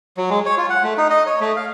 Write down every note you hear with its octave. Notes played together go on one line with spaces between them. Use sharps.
F#3
G#3
C#5
F4
F#5
A3
D#4
D#5
C#5
A3
F5